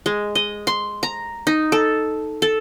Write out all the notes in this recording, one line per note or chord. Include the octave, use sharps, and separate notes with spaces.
G#3
D#5
C6
A#5
D#4
A4
A4